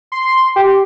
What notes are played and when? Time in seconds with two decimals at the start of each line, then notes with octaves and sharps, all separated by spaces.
0.12 C6
0.56 G4